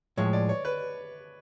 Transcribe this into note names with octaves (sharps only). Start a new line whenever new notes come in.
A2 F3 G#3 C#5
D5
C#5
B4